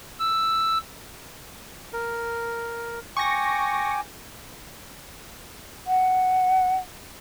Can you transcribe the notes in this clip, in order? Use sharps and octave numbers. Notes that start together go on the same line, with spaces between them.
E6
A#4
G5 G#5 C#6 D6 A#6
F#5